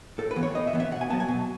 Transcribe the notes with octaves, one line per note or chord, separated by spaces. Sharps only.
A2 A4
B4
E3 B3
C#5
A2 D#5
E5
E3 B3
E5
B2 F#5
G#5
F#3 B3 A5
G#5
B2